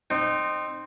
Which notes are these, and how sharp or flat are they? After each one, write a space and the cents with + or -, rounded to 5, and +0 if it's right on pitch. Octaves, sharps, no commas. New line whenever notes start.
C4 +0 D#4 -25